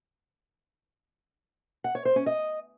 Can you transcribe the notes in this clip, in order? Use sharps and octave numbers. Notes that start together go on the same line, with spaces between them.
F#5
C#5
C5
C#4
D#5